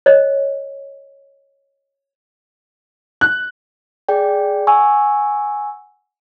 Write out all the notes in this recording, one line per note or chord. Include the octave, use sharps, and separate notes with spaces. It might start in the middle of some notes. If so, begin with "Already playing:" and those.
C#5 D#5
F#6
G#4 D5 G5
F#5 G#5 C#6 E6